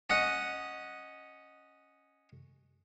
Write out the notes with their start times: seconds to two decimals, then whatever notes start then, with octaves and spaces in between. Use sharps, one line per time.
0.10 C#4 D#5 F#5